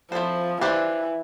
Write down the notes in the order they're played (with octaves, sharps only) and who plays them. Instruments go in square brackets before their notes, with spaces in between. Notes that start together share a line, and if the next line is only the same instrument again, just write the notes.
[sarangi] F3 [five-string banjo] C4 E4 A4 C5
[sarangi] E3 [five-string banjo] D4 G4 C5